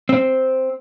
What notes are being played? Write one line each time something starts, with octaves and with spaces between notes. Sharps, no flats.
C4